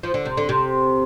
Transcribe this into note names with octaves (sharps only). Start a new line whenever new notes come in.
F3
D3
C3
D3
C3